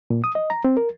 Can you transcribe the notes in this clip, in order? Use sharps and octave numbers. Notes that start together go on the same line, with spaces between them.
A#2
D#6
D#5
A#5
C4
A#4